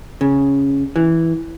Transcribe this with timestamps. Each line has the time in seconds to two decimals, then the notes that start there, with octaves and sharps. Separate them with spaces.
0.21 C#3
0.96 E3